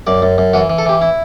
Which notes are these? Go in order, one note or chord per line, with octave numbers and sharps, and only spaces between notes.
F#2 D5
F#2
F#2
E3 F#4
E3
A4
E3 G4
E4